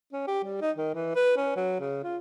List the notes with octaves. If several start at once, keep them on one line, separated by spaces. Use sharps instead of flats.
C#4
G4
G3
D#4
D#3
E3
B4
C#4
F#3
C#3
F4